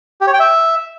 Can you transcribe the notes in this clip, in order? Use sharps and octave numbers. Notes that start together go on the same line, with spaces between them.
G4
C#5
G5
E5